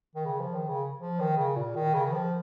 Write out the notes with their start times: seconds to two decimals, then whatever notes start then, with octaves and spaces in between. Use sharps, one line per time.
0.15 D#3
0.26 C#3
0.40 F3
0.54 D#3
0.68 C#3
1.00 F3
1.20 D#3
1.37 C#3
1.56 A#2
1.75 D#3
1.94 C#3
2.05 D#3
2.12 F3